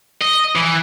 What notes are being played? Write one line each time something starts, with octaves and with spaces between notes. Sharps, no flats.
D#5
E3